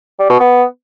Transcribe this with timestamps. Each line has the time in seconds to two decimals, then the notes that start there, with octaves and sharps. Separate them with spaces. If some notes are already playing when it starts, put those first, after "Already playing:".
0.19 G3
0.30 B2
0.40 B3